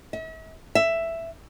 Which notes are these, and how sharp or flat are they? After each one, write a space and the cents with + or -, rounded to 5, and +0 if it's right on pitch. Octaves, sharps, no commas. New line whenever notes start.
E5 -45
E5 +10